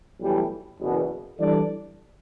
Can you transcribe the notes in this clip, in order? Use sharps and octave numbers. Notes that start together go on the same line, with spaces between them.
B1 A2 E3 G3
F#1 E2 B2
E3 G3 D4 A4 D5